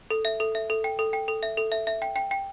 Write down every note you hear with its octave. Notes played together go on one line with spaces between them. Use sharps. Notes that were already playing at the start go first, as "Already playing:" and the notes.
A4
E5
A4
E5
A4
G5
A4
G5
A4
E5
A4
E5
E5
G5
G5
G5